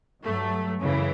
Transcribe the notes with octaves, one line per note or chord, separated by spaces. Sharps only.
G2 F#3 A3
F#2 C#3 E3